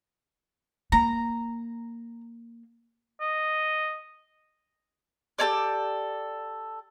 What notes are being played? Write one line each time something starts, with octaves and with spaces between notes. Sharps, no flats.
A#3 A#5
D#5
G4 A4 C#5 D5